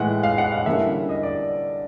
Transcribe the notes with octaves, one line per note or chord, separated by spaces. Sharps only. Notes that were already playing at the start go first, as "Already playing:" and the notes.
Already playing: A2 E3 G#3 F#5
F5
F#5
F5
D3 G3 A#3 C#4 E4 E5
D#5
D5